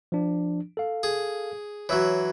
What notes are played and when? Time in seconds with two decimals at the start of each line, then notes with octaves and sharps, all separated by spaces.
0.12 F3 D4
0.77 A4 F5
1.03 G#4
1.89 E3 F#3 C#5 E6